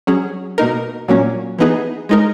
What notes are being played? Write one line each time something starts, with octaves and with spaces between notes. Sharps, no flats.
F#3 C#4 G#4
B2 A#3 D#4 A#4
A#2 F#3 A#3 C#4
E3 B3 D#4 G#4
G#3 D#4 A#4